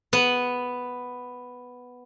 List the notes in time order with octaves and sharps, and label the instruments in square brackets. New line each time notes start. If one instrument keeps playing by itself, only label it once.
[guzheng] B3 F#5